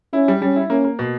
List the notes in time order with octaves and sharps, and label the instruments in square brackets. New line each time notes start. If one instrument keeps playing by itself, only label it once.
[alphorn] C#4 [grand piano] E4
[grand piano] G3
[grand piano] G3 [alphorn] C#4
[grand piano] E4
[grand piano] A#3 [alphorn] C#4
[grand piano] A#3
B2